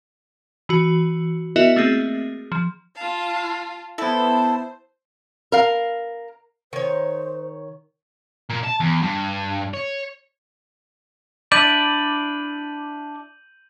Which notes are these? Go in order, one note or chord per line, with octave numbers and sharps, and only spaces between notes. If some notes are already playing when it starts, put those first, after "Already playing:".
E3 F#4
B3 E4 F#4 A#4 D#5 E5
A3 A#3 C4 G#4
F3
F4 F5 A5
B3 E4 A4 C5
A#4 F5
D#3 C5 C#5
A#2
A5
E2
G2
C#5
D4 E4 D5 G6 D#7 F#7